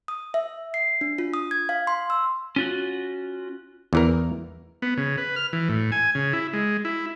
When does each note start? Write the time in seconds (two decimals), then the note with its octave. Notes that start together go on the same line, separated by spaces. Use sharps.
0.08 D#6
0.34 E5
0.74 C7
1.01 D4
1.18 F4
1.34 D#6
1.51 G#6
1.69 F5
1.87 C6
2.10 E6
2.56 C#4 F4 F#4
3.93 E2 E3 A#4
4.82 B3
4.97 C#3
5.18 B4
5.36 F6
5.53 E3
5.69 A2
5.92 G#5
6.15 C#3
6.33 E4
6.53 G#3
6.85 E4